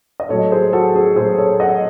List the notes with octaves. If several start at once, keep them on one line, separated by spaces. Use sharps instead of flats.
D#5
A2 F#3 A3 A4 C#5
G#4 C5
F#4 A4
G#4
A2 F#3 A3 G#4 C5
A4 C#5
D#5 F#5